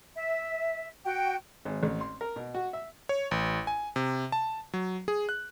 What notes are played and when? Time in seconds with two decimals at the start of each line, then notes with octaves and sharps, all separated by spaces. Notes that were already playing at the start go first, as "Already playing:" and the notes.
0.15 E5
1.05 F#4 G5
1.65 G#1
1.83 A1
2.01 C6
2.21 A#4
2.36 B2
2.54 F#4
2.73 E5
3.09 C#5
3.31 A1
3.67 G#5
3.96 C3
4.32 A5
4.74 F#3
5.08 G#4
5.29 F#6